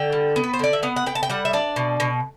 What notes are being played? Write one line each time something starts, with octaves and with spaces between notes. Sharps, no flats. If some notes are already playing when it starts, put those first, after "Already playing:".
Already playing: D3 G5
G3
B3
B4
C5
D3 D5
E5
B3 F#5
F#5
B3 G5
A5
G5
G3 F#5
E5
D4 D5
B2
B2